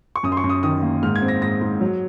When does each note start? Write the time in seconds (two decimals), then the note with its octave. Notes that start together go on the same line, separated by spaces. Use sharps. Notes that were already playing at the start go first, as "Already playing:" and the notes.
0.16 C#6
0.23 F#2 D#6
0.32 C6
0.37 C#6
0.44 F#2
0.49 D#6
0.63 D#3 D#6
0.83 A#3
1.03 G#2 F6
1.16 G#6
1.22 C4
1.28 A#6
1.42 G#2 A#6
1.61 G#2
1.81 F#3